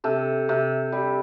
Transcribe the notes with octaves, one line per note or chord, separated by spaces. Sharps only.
C3 A4
C3
G3